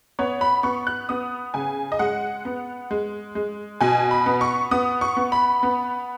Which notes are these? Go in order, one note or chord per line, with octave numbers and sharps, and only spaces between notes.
B3 C#5
B5
B3 C#6
F#6
B3 D#6
C#3 G#5
D#5
G#3 F#5
B3
G#3
G#3
B2 G#5
B5
B3
C#6
B3 D#6
C#6
B3
B5
B3